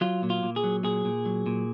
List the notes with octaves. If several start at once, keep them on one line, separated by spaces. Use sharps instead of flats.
F#3 F4
A#2
F4
A#2
G#4
F#3
A#2 G#4
A#2
F#3
A#2